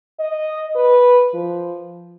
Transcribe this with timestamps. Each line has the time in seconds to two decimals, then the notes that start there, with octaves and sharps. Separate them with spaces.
0.19 D#5
0.75 B4
1.34 F3